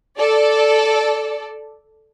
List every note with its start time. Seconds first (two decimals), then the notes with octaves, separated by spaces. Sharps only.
0.17 A4 D5